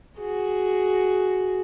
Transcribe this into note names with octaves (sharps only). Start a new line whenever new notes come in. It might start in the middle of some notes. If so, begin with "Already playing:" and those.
F#4 G#4